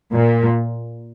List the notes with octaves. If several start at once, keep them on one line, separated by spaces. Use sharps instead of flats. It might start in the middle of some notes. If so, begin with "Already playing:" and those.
A#2